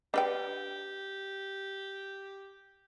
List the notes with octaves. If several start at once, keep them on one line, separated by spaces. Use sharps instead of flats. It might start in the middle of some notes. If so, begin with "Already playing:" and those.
D4 G4 B4 G5